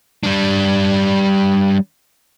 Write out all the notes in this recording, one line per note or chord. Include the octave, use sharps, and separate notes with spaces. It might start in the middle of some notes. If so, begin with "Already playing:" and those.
G3 D4